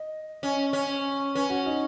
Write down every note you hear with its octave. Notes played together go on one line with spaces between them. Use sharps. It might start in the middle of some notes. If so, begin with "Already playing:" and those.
Already playing: D#5
C#4 D#5
C#4 C#5
C#4 B4
F#4
D#4